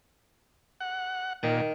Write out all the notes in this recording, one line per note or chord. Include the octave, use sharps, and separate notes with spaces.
F#5
A#2 D#3